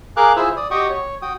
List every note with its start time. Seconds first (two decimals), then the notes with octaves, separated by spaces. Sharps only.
0.17 G#4 A#4 F5 G#5 D6 F#6
0.36 E4 F4 G#4 C5 E5
0.57 D5 D#6
0.71 F#4 G4 D#5 G5 C#6 D#6
0.89 C#5
1.22 F#4 G5 D#6